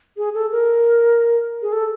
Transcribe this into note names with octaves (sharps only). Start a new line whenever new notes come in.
G#4
A4
A#4
G#4
A4